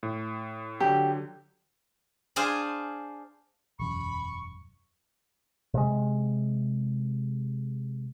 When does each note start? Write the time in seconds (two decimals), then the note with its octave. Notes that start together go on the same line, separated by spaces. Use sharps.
0.03 A2
0.80 D3 F#3 G4
2.36 D4 G#4 C5 F5 G#5
3.80 E1 F#2 B5 C#6
5.74 C3 G#3